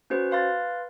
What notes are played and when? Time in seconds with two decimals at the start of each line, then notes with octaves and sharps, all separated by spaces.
0.10 C#4 F#4 B4 C5
0.31 B4 F5 C6 A6